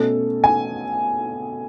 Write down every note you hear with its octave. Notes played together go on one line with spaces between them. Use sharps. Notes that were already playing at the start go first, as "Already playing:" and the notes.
Already playing: B2 A3 C#4 A4
G#5